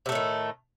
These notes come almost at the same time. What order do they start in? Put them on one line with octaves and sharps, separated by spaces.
C3 A3 A2 D#3